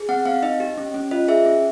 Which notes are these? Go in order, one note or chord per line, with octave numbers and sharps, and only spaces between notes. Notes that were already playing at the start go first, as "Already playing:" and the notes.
Already playing: G#4
C4 F#5
C4 F5
D#4 D#5
G4
C#4
C#4
F4 D#5
G#4 E5
C#4